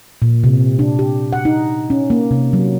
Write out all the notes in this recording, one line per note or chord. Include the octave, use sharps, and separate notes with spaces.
A#2
C3
D4
G4
F#5
D#4
C#4
A#3
C3
F#3